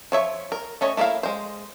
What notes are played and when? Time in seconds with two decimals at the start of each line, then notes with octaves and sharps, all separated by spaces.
0.12 F3 C#5 E5
0.52 A#4
0.81 A3 C#4 C#5 D#5
0.97 A3 A#3 E4 G#4 F5
1.23 G#3 C5